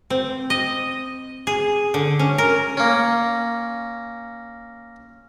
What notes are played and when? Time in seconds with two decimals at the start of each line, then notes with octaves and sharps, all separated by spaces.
0.10 C4
0.50 D#5
1.47 G#4
1.94 D3
2.19 C#4
2.38 A#4
2.77 A#3 C#4